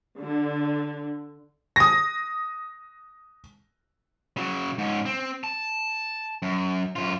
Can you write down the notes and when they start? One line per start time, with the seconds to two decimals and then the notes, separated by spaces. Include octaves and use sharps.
0.20 D3
1.76 D#6 A#6
4.37 C#3 F#3
4.78 G#2 C#4
5.05 C4
5.44 A5
6.42 F#2
6.96 F#2 F4